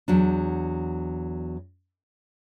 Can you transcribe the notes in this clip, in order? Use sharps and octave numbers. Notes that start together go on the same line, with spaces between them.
E2 F#3 D4